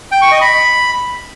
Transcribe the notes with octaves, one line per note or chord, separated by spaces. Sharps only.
G5
C#6
D#5
B5